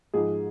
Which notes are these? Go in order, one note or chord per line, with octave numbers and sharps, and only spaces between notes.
G#2 F3 G#4